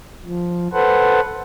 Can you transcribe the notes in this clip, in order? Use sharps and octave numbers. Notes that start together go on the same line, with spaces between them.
F3
A4 B4 C5 F#5